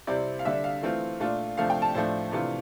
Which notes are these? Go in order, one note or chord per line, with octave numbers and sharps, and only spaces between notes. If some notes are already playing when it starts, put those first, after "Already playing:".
C3 G3 C4 E4 D5
F5
D3 G3 D4 E5
F5
E3 A3 C4 F4
A#2 A3 D4 F4
C3 F3 A3 D4 F5
G5
A5
A2 F3 A3 D4 C5
C3 E3 A3 D4 F4